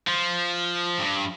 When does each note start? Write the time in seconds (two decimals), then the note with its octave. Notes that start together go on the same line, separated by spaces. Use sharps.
0.07 F3
0.99 G2